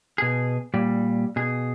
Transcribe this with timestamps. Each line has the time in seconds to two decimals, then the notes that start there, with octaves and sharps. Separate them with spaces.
0.18 B2 G#4
0.74 A#2 G3
1.36 B2 G#4